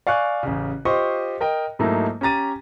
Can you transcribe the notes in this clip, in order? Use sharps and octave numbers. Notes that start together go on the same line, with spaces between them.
D5 F5 G#5 C#6 F#6
A1 C#3
F4 G4 C5 D#5 C#6
A#4 D#5 G5
G#2 F#3 A3 A#3 D#4 E4
C#4 G4 A#5 A6 D#7